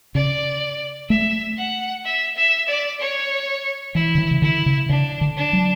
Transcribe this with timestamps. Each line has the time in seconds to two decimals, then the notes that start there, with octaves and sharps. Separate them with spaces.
0.15 C#3 D5
1.10 A3 E5
1.57 F#5
2.05 E5
2.37 E5
2.68 D5
3.00 C#5
3.95 E3 E4
4.15 D3
4.18 E3
4.31 C#3
4.42 D3 E4
4.66 C#3
4.89 C#3 D4
5.21 D3
5.37 D4
5.53 F#3